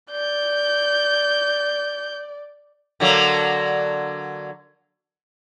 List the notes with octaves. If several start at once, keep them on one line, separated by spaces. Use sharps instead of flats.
D5 G6
D3 F#3 A#3